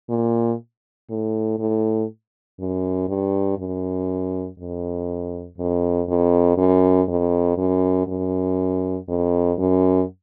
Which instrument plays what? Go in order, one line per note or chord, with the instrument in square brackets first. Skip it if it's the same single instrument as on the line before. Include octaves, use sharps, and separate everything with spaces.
[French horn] A#2
A2
A2
F#2
G2
F#2
F2
F2
F2
F#2
F2
F#2
F#2
F2
F#2